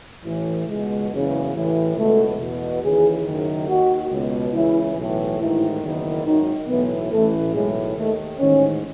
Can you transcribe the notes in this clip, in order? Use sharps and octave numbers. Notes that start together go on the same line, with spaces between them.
A1 A2 E3
C#2 B2 G#3
F#1 E2 C#3 E3
A1 A2 E3
C#2 B2 A3
E2 B2
D#2 C#3 E3 G#4
F#1 F#2 D#3
D#2 D#3 F#4
C#2
B2
C#2 C#3 E3 E4
B1 A2 E3
A1 G#2 D#3 E4
F#1 E2 D#3
G#1 F#2 D#3 D#4
B1 A2 E3 B3
A1 A2 E3 A3
B1 A2 E3 G#3
D#2 D#3 A3
A1 G#2 D#3 C#4